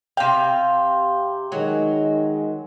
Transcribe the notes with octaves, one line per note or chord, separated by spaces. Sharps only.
C3 F5 G5
D#3 F#3 G#3